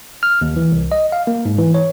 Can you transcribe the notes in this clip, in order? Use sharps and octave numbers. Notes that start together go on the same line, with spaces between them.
F6
D#2
E3
C2
D#5
F5
A#3
G#2
E3
C#5